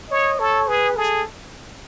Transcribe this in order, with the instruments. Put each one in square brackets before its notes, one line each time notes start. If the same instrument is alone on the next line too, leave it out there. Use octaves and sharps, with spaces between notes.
[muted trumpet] C#5 [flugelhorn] D#5
[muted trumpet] A4 [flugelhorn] C#5
[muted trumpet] G#4 [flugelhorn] B4
[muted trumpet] G#4 [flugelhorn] A4